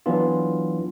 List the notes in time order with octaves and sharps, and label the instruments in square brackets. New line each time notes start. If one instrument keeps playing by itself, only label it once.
[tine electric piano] E3 F#3 B3 D4 F4